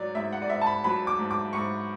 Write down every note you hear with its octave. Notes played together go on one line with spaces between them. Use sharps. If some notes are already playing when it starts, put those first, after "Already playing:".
Already playing: G#2 F#3 C#5 D5
G#2 E5
F#5
D5
G#2 E5
A5
B5
F#3 B5
D6
G#2
D6
G#2 C#6